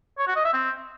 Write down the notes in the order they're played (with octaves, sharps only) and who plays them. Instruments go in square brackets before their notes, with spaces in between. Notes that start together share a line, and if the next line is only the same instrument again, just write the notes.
[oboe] C#5
F#4
D#5
E5
C4